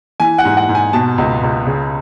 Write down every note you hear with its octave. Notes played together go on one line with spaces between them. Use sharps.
E3 G#5
F#5
G#2
F#5
G#2
G#5
B2 A5
C#2
C#2
C#3